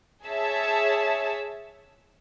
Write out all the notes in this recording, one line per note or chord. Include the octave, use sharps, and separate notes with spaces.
G#4 C#5 E5 A5